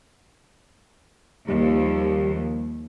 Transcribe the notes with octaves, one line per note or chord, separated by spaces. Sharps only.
D#2 F3 G3